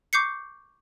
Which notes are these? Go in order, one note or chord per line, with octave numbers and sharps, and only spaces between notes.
C#6 D6 G6 C7 C#7